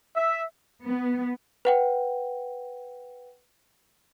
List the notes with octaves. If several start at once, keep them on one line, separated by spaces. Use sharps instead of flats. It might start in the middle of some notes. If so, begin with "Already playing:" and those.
E5
B3
B4 F#5 G5